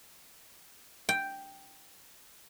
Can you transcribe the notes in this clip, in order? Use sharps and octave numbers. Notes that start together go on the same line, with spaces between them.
G5